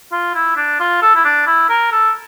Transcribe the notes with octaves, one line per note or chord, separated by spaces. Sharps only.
F4
E4
D4
F4
A4
E4
D4
E4
A#4
A4